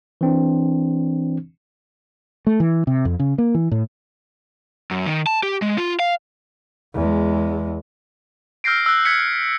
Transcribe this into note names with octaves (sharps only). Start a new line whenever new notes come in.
E3 C4 D4
A3
E3
C3
F2
C#3
A#3
E3
A2
F#2
D#3
A5
G4
G#3
F4
F5
E2 G#3
E6 F6 G6 A#6 C7 D7
E6 F#6
F#6 G#6 B6 C#7